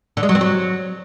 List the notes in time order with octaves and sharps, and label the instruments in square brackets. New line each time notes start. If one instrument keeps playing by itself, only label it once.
[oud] D3
G#3
F#3
C4
F#3